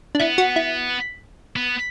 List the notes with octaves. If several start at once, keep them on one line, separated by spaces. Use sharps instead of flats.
D4
B3 E4
F#4
E4
B3